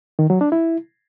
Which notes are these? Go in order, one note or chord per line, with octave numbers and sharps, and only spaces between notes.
D#3
F#3
D4
E4